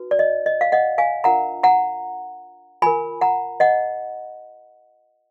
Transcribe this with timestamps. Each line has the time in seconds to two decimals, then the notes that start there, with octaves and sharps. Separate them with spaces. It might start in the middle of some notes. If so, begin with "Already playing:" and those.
Already playing: D#4 F#4 B4
0.11 D5
0.19 D#5
0.46 D#5
0.61 F5
0.72 D#5 F#5
0.98 F5 G#5
1.24 D4 F4 A#4 F#5 A#5
1.63 F#5 A#5
2.82 F4 A#4 G#5 B5
3.21 F#5 A#5
3.60 D#5 F#5